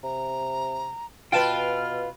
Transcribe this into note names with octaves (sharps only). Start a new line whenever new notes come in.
C3 A#5
B2 F4 B4 G5 A5 F6